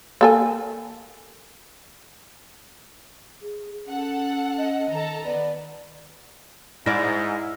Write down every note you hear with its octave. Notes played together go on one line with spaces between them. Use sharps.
A#3 A4 G#5
G#4
C#4 A4 F#5
D#5
D#3 A4 A5 A#5
B3 D5
G#2 E4 D5 F6 A#6